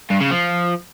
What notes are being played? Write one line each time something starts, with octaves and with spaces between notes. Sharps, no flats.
G2
C#3
F3